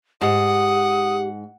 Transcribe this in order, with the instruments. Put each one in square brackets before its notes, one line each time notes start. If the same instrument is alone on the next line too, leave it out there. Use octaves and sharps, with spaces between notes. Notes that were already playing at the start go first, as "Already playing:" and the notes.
[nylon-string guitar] G#2 [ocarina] G4 [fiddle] F#5 [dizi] D#6